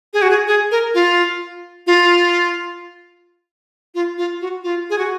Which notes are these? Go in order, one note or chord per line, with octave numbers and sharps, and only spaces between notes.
G#4
F#4
G#4
G#4
A#4
F4
F4
F4
F4
F#4
F4
G#4
F#4